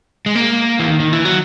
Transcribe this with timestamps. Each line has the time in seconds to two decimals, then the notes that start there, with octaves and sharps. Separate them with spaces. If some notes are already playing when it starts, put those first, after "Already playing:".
0.26 G#3
0.35 A#3
0.79 E3
0.87 D#3
1.00 D#3
1.13 E3
1.25 F#3